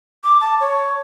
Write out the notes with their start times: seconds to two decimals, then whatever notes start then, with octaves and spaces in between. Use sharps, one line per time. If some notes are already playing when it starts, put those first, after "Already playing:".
0.24 D6
0.41 A5
0.60 C#5